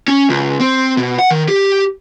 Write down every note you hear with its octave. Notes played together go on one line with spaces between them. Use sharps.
C#4
C#2
C4
B2
F#5
D#3
G4